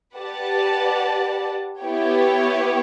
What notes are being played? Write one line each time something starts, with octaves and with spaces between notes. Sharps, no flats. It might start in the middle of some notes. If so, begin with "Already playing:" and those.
G4 B4 D5 F#5 A5
B3 E4 G4 C#5 G5